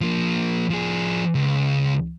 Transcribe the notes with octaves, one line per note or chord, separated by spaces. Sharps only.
F3 A#3
F3 G#4
C#2